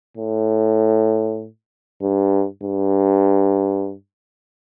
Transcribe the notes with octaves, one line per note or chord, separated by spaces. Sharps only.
A2
G2
G2